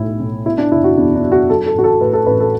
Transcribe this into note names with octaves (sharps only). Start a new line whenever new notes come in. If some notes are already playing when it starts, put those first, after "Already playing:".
Already playing: B1 A2 E4
B1
B2 E4
D4
F#1 E4
F#4
E2 D4
D4
F#3
F#4
F#3 A4
A4
A1 F#4
A4
A2 B4
A4
A1 B4
A4